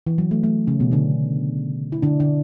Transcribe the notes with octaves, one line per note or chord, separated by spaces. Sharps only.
E3
F#3
A3
A3
C#3 C#4
B2 B3
D3 D4
E4
D3 D4
D3 D4